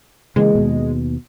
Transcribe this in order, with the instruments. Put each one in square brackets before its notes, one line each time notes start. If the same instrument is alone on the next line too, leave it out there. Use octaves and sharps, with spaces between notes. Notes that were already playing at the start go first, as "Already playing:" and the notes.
[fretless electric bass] C#3 E3 A#3 [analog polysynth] G#3
[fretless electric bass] D#2 B2